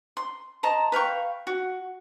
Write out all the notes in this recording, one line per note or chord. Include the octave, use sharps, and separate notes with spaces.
C6
D#5 A5 A#5 C6
B4 F5 G5 C#6
F#4